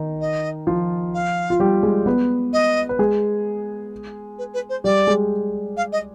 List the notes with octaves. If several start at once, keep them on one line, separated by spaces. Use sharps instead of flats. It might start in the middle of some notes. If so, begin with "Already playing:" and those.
Already playing: D#3 D#4
D#5
F3 F4
F5
F4
G3 G4
G#3 G#4
B3 B4
D#5
B4
G#3 G#4
B4
B4
C5
G3 G4 D5
G#3 G#4
F5
D#5